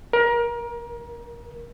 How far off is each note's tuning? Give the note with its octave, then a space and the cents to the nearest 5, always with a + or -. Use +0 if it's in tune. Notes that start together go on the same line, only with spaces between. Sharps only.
A#4 +30